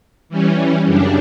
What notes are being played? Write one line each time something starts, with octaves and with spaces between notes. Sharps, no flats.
E3 G3 C#4
F#2 C#3 G3 D4